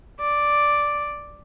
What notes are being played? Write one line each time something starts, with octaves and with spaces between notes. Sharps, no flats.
D5